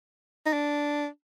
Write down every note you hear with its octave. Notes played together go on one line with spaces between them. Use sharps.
D#4
D4